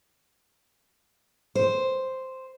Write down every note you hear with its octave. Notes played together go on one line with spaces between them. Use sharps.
C5